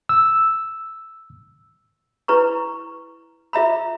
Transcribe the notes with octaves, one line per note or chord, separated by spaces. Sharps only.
E6
E4 B4 A#5 C#6
F4 E5 A#5 B5